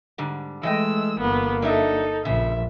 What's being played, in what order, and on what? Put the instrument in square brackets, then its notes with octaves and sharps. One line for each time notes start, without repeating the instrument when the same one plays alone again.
[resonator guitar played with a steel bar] G#2 D3 G3
[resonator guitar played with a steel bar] E3 D#5 G5 [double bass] G#3 A3 [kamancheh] E6
[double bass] G1 A#3 [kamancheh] B3
[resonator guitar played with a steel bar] F#3 D4 E5 [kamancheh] D#4 A4
[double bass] A#1 [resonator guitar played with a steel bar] C#3 F3 [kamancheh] E5